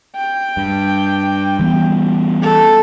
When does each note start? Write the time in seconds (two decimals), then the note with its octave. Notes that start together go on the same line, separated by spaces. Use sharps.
0.15 G5
0.57 G2
1.59 E3 G3 B3
2.42 A4